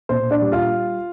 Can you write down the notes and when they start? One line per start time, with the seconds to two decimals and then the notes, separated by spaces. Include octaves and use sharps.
0.09 A#2 C5
0.31 D4 D5
0.41 G3
0.52 F4 F5